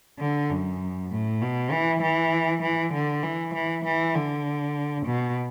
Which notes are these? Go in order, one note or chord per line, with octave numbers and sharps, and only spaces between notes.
D3
F#2
A2
B2
E3
E3
E3
D3
E3
E3
E3
D3
B2